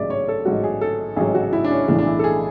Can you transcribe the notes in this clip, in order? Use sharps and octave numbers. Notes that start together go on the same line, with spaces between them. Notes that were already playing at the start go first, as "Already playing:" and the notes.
Already playing: A1 G#2 F#3 D5 E5
C#5
A4
A1 G#2 F#3 F#4
G#4
A4
A1 G#2 F#3 G#4
F#4
E4
D4
C#4
B1 A2 E3 G#3 D4
D4
E4
A4
G#4